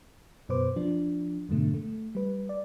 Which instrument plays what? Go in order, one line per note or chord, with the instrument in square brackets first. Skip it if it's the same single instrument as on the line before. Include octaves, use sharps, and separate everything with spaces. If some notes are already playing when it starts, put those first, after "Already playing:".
[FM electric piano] F#2 B2 B4 C5 D6
F3 D4
F2 G#2 B2 D3 A3
A3
G3 B4
D5